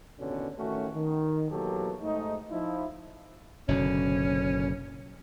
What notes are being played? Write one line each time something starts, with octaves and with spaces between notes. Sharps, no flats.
A1 D#2 B2 D3 C#4
A1 D#3 A3 C#4 F#4
D#3
B2 E3 F#3 A#3 G4 A4
G#2 A3 D#4
F3 D#4 E4
F#1 B2 D3 C#4